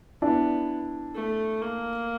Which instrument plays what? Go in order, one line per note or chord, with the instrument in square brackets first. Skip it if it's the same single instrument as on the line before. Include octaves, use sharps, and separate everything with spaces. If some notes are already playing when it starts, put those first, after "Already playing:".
[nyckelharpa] B3 [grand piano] D4 E4
[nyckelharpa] A3
A#3